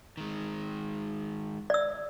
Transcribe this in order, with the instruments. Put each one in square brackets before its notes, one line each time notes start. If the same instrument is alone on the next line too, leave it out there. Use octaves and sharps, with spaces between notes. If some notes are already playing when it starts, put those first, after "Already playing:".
[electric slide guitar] D#3 G#3
[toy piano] D5 E6